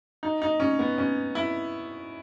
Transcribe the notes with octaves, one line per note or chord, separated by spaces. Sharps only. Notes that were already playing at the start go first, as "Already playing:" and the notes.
D#4
D#4
C#4
B3
C#4
E4